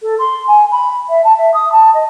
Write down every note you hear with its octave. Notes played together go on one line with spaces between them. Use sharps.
A4
C6
G#5
B5
E5
A5
E5
D#6
A5
D#5